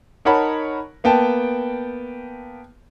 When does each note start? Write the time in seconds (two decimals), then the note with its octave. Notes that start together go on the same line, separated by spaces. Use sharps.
0.25 D#4 A#4 C#5 F#5 A5 B5
1.04 A#3 B3 G5 A5